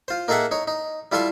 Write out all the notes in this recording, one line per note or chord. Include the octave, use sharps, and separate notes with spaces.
F4 C5
A#3 D#4 G#4 A4 E5 F#5
D#4 C#5
D#4
G3 E4 F4 A4 E5 C6